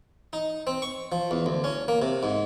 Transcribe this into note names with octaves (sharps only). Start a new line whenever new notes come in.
D#4
C4
C#6
F3
E2
D2
C#4
A#3
C3
G#2